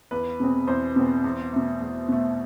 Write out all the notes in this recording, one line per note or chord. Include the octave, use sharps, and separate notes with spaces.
E2 B4
B2 G#3 C4
E2 C5
B2 G#3 C4
E2
B2 A3
E2
B2 A3